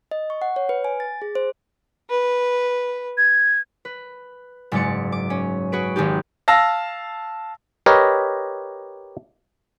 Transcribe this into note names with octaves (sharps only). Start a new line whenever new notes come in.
D#5
C#6
F#5
C#5
B4
G#5
A6
G#4
C5
B4
G#6
B4
F#1 G#2 G#3 D5 C#7
D6
C#4
F#4 G#4 B4 D7
G#1 G#3 D#4 G4
F5 A5 E6 A#6
G4 A#4 B4 C#5 D#5